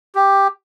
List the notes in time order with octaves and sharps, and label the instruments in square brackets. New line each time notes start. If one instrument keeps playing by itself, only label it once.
[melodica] G4